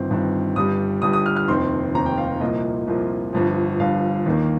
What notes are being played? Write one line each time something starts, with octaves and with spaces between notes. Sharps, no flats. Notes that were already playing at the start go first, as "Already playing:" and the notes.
Already playing: G1 G2 D#3 C4
G1 G2 D#3 C4
G1 G2 G3 D#6
G1 G2 G3 D#6
D#6
F6
F6
F1 D#2 D#3 C4 C6
F1 D#2 D#3 C4 A#5
G5
F5
C2 A#2 F3 A#3 D#5
C2 A#2 F3 A#3
G1 G2 F3
G1 G2 F3 F5
D#2 D#3 A#3